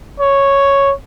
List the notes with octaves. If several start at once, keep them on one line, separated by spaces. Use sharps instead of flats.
C#5